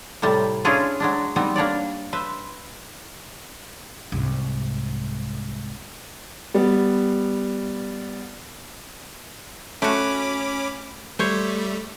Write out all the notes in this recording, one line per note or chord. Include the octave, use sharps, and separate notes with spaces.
A2 C3 G3 A5
C#4 D4 E4 F4 G#4
F#3 G#3 D4
G3 B3 C4 D#4
A#3 D4 C#5 D5
B4 C5 E5
C2 G#2
G3 B3
A3 C#4 F#4 B5 D6
G3 A3 C5 C#5